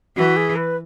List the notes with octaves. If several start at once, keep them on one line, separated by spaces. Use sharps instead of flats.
E3 F#4
G#4
B4